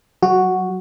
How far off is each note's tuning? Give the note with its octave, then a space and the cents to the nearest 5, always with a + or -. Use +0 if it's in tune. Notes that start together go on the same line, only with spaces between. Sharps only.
F#3 +0 F#4 +0